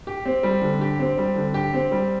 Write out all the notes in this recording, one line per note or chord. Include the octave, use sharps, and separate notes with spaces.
G4
C4
G3
D3
G4
C4
G3
D3
G4
C4
G3